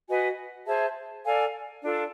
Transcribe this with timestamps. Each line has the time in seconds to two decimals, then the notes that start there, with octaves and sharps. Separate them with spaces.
0.08 F#4 B4 D#5 G#5
0.66 G#4 C5 E5 A5
1.24 A4 D5 F5 G#5
1.83 D4 F4 A4